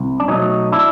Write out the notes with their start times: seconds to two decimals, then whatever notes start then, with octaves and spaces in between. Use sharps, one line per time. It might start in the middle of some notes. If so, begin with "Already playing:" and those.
Already playing: C2
0.20 D4
0.28 B2 F#3 A3 C#4 D#4
0.72 D4 E4